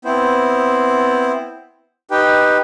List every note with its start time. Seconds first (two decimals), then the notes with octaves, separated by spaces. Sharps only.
0.05 B3 C4 E4 C5
2.11 D#4 G4 B4 G5